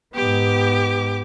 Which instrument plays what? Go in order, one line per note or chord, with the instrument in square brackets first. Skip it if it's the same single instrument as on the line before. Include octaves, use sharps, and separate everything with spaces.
[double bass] G#2 B3 [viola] G4 D6